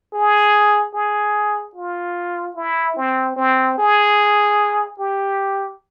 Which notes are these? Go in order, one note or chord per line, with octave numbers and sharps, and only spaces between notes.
G#4
G#4
F4
E4
C4
C4
G#4
G4